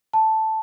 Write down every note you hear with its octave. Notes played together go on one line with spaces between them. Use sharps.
A5